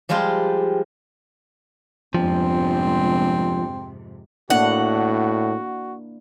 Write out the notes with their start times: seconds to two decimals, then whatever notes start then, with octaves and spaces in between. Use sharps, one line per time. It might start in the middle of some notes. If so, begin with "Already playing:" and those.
0.09 F3 G3 G#3 F4 G4
2.14 G1 F2 G#2 C3 F3 C4
4.50 A2 A#3 D4 E4 F#4 F#5